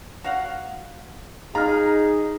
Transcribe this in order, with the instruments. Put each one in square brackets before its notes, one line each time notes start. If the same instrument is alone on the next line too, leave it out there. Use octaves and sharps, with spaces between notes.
[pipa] F#4 F5 F#5
[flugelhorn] D#4 [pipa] F4 [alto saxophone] G#4 [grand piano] A#5 F6